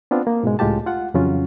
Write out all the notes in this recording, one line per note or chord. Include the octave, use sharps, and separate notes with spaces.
B3 C4 D4 F4
A#3
G#2 B2 G#3
C#2 A2 G#3 F4 G4 A5
F4 F#5
F2 C#3 E3 F#3 C#4 F4